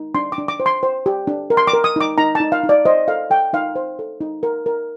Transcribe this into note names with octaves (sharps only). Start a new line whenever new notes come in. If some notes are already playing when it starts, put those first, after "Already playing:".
Already playing: D#4
D4 C6
D6
D4
D6
C5
C6
C5
G4
D4
A#4
C6
D6
A#4
D#6
D#4 D6
D#4 A#5
D#4 A5
F5
D#4
D5
C5 D#5
A4 F5
A4 G5
D#4 F5
C5
A4
D#4
A#4
A#4